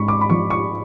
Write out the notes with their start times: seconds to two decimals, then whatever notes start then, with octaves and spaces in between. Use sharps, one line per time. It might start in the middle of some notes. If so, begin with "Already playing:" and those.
Already playing: G#2 C#4 B5 C#6
0.08 D6
0.21 B5
0.30 F3 C#6
0.50 C#6